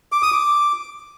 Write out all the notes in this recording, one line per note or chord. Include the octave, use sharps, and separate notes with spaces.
D6
D#6
D6